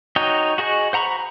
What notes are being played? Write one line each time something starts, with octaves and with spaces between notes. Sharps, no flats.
D#4 F#4 C#5 D#5 G5
F#4 G#4 D#5 C#6
C5 F#5 A#5 B5 C#6